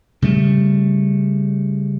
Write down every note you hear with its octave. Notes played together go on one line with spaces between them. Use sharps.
C#3 G3 A3